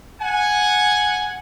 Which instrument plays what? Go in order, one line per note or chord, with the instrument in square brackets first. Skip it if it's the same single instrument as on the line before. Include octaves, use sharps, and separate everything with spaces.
[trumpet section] F#5 G#5